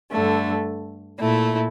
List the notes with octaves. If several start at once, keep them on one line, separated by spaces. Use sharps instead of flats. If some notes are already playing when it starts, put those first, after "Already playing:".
G2 D3 A3
A#2 A3 E4